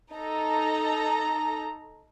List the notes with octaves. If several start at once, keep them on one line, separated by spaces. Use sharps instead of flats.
D#4 A4 A#5